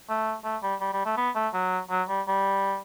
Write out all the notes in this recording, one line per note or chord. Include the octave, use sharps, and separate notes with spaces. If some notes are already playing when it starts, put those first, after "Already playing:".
A3
A3
G3
G3
G3
A3
B3
A3
F#3
F#3
G3
G3